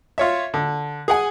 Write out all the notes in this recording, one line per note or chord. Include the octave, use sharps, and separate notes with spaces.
F4 C#5 E5
D3
G#4 F#5 G#5